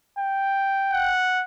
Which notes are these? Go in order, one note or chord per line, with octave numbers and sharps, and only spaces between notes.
G5
F#5